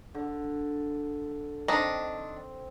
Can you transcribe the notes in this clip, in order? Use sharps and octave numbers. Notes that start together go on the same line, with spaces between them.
D3
D#3 C4 D4 D#5